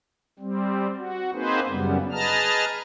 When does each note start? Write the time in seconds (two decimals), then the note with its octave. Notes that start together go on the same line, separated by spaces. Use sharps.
0.39 G3 C4
0.97 F#4
1.33 A#3 C4 D#4 G#4 B4 C5
1.68 F#2 C#3 G3 B3
2.12 G#4 B4 D#5 A5 A#5 F6